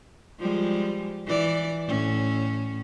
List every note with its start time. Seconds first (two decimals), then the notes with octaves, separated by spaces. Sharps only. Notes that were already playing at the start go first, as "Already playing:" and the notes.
0.39 F3 G3 G#3
1.26 E3 D5
1.87 A2 C#4